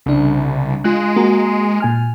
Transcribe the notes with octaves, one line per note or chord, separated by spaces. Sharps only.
C2 C#3 D4
G#3 F4 F#6
A#3 F#4 A#5
A#2 G#5 F6